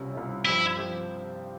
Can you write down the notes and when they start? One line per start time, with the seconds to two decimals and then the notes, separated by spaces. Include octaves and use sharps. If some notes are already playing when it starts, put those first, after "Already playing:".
Already playing: C2 C3 G3 C#4 F4
0.13 C2 C3 G3 C#4 F4
0.45 G2 F3 C4 E4 G4 C5
0.77 F3 C4 G4 C5